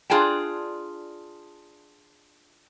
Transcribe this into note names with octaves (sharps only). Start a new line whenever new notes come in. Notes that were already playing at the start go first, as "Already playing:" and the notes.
D4 F4 G#4 D5 G5 A5